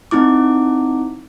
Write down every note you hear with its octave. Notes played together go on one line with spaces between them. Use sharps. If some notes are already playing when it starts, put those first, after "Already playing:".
C4 D#4 E4 D6